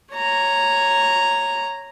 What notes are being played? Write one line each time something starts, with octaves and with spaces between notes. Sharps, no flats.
C#5 A#5